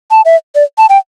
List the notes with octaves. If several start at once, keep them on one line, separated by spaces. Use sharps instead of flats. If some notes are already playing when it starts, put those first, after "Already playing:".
A5
E5
D5
A5
G5